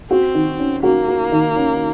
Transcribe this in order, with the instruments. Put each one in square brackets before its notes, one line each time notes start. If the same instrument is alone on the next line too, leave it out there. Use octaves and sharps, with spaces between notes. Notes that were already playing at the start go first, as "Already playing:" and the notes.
[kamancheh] C4 [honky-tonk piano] F#4
[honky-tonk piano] D#3
C#4
[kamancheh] A#3 [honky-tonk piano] F#4
[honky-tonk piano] F#4
D#3
C#4